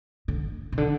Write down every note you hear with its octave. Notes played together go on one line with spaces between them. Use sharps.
D3
C3
D3